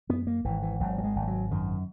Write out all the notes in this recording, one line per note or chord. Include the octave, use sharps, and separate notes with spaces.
F#2 B3
A#3
G#1 E3
E3
G#1 F#3
F#3
G#3
G#1
G#3
F#3
F#2 D#3